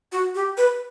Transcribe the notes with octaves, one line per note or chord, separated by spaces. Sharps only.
F#4
G4
B4